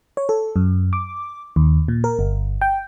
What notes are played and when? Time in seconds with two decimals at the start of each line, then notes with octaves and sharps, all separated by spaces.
0.17 C#5
0.29 A4
0.56 F#2
0.93 D6
1.56 D#2
1.88 A#2
2.04 A#4
2.19 G1
2.61 G5